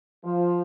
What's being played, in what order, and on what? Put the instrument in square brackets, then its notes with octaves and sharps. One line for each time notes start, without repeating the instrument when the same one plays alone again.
[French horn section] F3